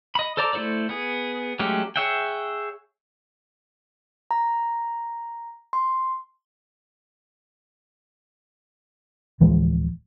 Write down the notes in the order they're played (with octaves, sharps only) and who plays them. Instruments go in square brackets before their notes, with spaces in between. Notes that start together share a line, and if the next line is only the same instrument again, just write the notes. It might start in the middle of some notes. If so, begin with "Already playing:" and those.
[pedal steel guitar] D#5 B5
A4 C5 D5 A#5 D6
A3 E4 A4 C5 D5
B3 G#4
F#3 G#3 A3 C#4 G4
G#4 C#5 E5 F#5 G5
[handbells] A#5
C6
[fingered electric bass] D1 E3 F3 G#3